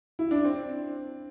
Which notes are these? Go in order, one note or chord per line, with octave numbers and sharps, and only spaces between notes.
E4
D4
C4